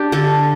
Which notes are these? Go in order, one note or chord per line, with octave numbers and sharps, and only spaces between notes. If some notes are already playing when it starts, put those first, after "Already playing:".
Already playing: D4 G4
D3 A4